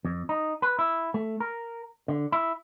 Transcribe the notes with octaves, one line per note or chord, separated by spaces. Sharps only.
F2
D#4
B4
E4
A3
A#4
D3
E4